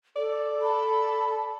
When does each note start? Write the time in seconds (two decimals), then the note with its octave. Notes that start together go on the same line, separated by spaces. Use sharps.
0.16 A4 D5
0.61 A4 A5 B5